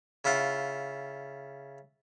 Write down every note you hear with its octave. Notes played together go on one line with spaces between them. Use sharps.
C#3 E4 F4 F#5